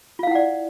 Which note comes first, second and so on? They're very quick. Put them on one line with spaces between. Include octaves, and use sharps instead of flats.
F4 F5 E4 F#5 D5